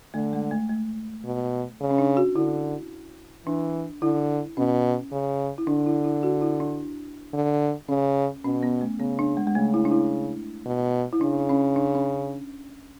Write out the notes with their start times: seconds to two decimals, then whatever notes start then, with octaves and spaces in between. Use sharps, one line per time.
0.14 D3 A3
0.33 G#3
0.51 A3
0.69 A3
1.25 B2
1.81 C#3
1.91 C#4
1.98 D4
2.17 F#4
2.36 D3 E4
3.46 E3 D4
4.02 D3 E4
4.57 B2 C#4
5.12 C#3
5.58 E4
5.67 D3 D4
5.86 E4
6.04 E4
6.23 F#4
6.41 E4
6.60 D4
7.34 D3
7.89 C#3 C#4
8.44 B2 C#4
8.63 B3
8.81 A3
8.99 C#3 B3
9.19 D4
9.37 G#3
9.47 G#3
9.55 C#3 A3
9.74 E4
9.85 D4
9.91 E4
10.66 B2
11.13 E4
11.21 C#3 D4
11.49 C#4
11.76 D4
11.95 C#4